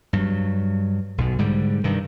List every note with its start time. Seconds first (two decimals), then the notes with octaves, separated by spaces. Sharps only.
0.13 G2 F#3
1.18 B1 B2
1.39 G#2 D3 G3
1.84 G2 C3 D#3